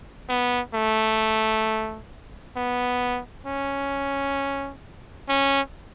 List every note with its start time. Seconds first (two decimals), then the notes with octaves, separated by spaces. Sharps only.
0.29 B3
0.74 A3
2.56 B3
3.46 C#4
5.29 C#4